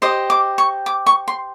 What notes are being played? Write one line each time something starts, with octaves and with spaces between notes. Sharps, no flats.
G4 C5 D#5 D#6
D6
C#6
D6
C#6
C6